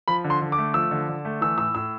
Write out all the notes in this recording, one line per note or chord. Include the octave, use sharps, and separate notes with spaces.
F3 B5
D3
C6
D3
D6
A3
F3 E6
D3
D3
A3
E3 E6
A2 E6
A2 E6